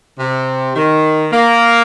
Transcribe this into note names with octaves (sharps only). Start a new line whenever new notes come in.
C3
D#3
A#3